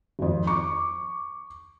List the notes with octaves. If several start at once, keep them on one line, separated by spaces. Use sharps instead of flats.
G#1 F2
C#6 D6